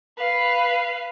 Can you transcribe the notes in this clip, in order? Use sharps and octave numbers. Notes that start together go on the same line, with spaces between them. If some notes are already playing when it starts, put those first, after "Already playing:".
B4 F5